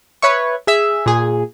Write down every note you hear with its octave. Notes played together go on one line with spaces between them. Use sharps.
B4 C#5 E5 C#6
G#4 E5 E6
A#2 G#4